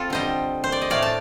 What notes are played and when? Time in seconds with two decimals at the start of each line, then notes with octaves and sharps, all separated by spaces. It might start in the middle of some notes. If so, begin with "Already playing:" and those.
Already playing: C4 F4 A4
0.10 D3 G3 C5 D#5
0.64 C5
0.72 D5
0.82 D#5
0.90 A2 A3 D5 F5
1.02 A5